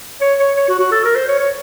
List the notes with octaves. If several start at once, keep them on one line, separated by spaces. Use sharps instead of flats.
C#5
C#5
C#5
F#4
F#4
A4
A#4
C5
C#5
C#5